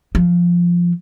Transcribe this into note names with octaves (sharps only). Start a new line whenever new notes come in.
F3